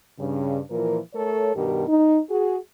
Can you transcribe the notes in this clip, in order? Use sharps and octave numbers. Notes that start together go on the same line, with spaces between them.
G2 C#3
A#2 E3 F3 A#4
A3 A4 A#4 C#5
G2 B2 D#3 G4 A#4
D#4
F#4 G#4